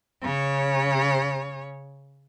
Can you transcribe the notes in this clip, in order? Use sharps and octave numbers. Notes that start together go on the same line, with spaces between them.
C#3 C#5